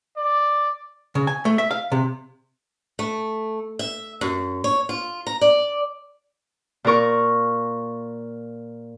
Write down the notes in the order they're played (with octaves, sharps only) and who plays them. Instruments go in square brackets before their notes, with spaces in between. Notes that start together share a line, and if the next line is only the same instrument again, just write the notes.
[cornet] D5
[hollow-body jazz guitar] C#3
G#5
A3
E5
F5
C3
[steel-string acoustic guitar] A3
E5
F#2
C#5
F4
A#5
D5
[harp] A#2 F4 A#4 C#6